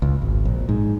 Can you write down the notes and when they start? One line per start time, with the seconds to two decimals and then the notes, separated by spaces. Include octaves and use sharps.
0.02 C#2
0.22 G#1
0.45 A#1
0.69 G#2